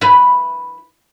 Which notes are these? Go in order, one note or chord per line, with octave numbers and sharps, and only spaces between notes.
E4 B4